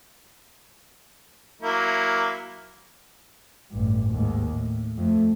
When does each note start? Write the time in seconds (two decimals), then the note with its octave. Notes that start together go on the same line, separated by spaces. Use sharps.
1.62 F#3 A#3 E4
3.71 A1 G2
4.11 D#2 G#2
4.51 A2
4.96 F2 A3